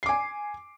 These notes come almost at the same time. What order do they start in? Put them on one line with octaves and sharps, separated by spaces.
C7 D6 G#5